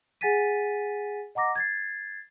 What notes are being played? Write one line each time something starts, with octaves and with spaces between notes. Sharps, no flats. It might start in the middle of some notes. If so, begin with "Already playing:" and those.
G#4 F#5 G#5 A6 B6 D#7
D#5 F#5 A#5 D6 A#6
G#6 A6 C7